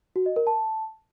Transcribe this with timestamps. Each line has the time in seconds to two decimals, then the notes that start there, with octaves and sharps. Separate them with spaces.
0.16 F#4
0.26 D#5
0.36 A#4
0.47 A5